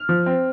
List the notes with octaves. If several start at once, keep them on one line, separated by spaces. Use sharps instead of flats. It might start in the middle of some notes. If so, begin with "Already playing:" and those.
Already playing: F6
F3
C4